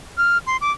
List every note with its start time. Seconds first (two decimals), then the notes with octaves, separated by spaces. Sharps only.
0.18 F6
0.47 C6
0.61 D6